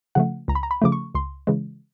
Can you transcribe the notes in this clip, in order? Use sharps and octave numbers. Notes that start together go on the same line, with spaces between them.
C#3 F3 A3 F#5
C#2 A#5
B5
A#5
B5
C#3 F3 A3 D6
C#6
C#2 C6
C#3 E3 G#3